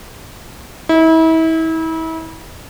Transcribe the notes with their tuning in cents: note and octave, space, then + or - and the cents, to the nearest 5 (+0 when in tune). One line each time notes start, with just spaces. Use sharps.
E4 -35